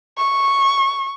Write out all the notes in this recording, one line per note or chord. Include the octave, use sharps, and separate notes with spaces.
C#6